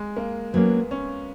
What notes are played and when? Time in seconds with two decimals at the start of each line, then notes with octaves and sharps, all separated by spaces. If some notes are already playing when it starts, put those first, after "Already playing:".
Already playing: G#3
0.17 A#3
0.53 F#3 A#3 B3 C#4
0.91 C#4